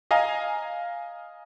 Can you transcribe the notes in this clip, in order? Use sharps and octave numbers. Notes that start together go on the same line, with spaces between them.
D#5 F5 G#5 A#5